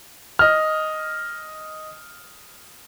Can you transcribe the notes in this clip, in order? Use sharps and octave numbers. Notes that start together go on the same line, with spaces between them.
D#5 F6